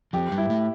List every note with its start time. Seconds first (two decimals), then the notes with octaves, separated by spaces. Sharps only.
0.13 F2 F3 G4
0.31 G2 G3
0.38 E4
0.50 A2 A3